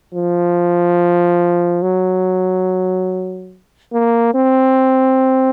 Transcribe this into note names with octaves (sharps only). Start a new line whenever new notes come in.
F3
F#3
A#3
C4